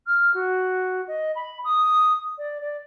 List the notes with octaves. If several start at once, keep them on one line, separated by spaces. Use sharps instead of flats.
F6
F#4
D#5
B5
D#6
D5
D5